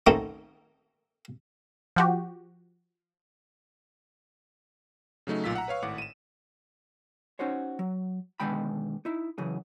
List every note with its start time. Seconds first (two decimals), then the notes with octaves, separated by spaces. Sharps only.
0.07 D#3 F#3 A3 C4 C#4 D#4
1.96 F3 F#4 G4
5.27 C#3 F#3 A3 D#4
5.44 B1 A#2 F4 E6 B6
5.55 F#5 A#5
5.68 B4 C#5 F5 C#6
5.83 G#1 A2 F#5 D6
5.98 D#7 E7
7.39 C#4 D#4 F#4 C5 C#5
7.79 F#3
8.40 B2 D3 D#3 G#3 G5 B5
9.05 D#4 E4
9.38 C#3 E3 F#3 G#4